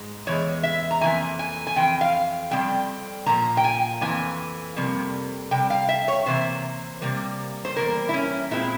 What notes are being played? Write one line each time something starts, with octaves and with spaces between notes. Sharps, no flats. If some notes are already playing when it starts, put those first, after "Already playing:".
Already playing: G#2 G#3
E2 E3 G#3 C#5
E5
A#5
F2 E3 A#3 G#5
G#5
G#5
F2 E3 G5
F5
F2 E3 G3 C4 G5
A#2 F3 A#3 A#5
G5
G#5
F2 E3 A#3 G#5
F2 C3 G3 A#3
C3 G3 G5
F5
E5
C#5
C3 E3 A#3 C5
C3 G3 A#3
C5
E2 C3 G3 A#3 A#4
E4
C#4
A#2 G#3 C4 E4